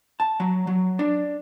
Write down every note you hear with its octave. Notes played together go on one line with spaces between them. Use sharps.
A5
F#3
F#3
D4